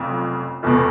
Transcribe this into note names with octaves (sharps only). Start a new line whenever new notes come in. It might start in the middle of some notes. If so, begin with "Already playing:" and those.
Already playing: F1 F2 C#3 F#3
F1 E2 B2